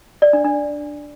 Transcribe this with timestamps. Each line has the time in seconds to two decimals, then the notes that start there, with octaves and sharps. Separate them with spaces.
0.22 D5
0.33 D4
0.45 D4